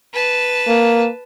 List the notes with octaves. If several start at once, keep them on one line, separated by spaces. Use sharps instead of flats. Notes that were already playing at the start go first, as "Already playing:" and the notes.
B4 A5
A#3